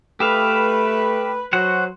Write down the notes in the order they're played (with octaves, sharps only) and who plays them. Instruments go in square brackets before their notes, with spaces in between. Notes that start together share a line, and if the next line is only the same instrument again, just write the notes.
[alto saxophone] A3 [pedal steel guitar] G4 E5 F5 [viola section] B4
[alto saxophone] F#3 [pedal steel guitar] F#4 C5 F#5